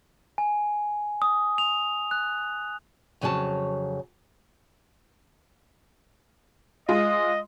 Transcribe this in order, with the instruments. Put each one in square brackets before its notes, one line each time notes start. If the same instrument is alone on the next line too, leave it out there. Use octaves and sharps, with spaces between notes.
[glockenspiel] G#5
D#6
F7
F#6
[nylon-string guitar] F2 C#3 F#3 C#5 A5
[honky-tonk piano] G#3 F4 [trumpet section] D#5